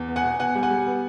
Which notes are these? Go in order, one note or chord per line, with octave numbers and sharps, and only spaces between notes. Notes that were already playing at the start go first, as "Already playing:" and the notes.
Already playing: E2
B3
F#5 G#5
B2
B2 F#5 G#5
G3
F#5 G#5
G3
B3